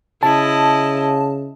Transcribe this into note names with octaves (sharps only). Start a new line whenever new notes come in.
C#3 E4 D#5 A5